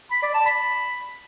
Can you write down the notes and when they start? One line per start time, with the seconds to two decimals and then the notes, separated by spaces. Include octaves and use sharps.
0.11 B5
0.23 D5
0.34 A5
0.46 B5